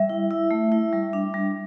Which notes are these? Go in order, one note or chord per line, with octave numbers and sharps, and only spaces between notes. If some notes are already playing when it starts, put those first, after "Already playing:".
Already playing: G3 E5
E4
E4
A3
E4
G3
D4
G3